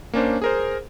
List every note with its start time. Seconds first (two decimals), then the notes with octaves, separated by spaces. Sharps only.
0.13 A#3 C#4 D4 C5
0.42 G#4 A#4 C5